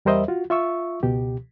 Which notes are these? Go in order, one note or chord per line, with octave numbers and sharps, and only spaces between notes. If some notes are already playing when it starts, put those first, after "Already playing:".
E2 G3 A#4 C5 D#5 E5
F4 F#4
F4 E5 C#6 E6
C#2 B2 G4